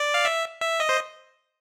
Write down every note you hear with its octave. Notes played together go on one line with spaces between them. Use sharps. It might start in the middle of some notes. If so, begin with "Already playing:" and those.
Already playing: D5
F5
E5
E5
D#5
C5